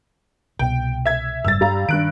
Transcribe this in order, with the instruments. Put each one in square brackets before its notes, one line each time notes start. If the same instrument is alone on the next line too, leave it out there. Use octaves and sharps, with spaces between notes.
[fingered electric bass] C2 B2 [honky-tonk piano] G5
[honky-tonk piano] E5 G#6
[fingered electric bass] F#1 G#2 G3 [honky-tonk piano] E6 A6
[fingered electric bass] G2 [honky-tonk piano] G3 F5 A#5
[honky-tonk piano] G2 F#6 D7 [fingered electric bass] D#3